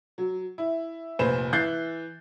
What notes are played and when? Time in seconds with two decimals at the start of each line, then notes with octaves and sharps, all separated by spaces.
0.18 F#3
0.58 E4
1.19 F1 A#2 B4 C5 E7
1.53 E3 F#6 G6 A6 C7